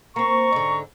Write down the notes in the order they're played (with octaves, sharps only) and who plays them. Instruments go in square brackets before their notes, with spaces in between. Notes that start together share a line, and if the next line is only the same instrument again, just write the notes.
[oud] A#3 C4 [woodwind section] A#5 C#6
[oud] G#2 D3